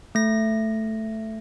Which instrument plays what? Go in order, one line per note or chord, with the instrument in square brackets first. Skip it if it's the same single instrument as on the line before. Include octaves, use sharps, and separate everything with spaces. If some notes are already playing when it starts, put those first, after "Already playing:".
[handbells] A3 A#6